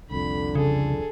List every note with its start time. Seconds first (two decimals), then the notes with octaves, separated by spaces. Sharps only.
0.11 C2 F2 D3 B5
0.55 C#3 G#4 A4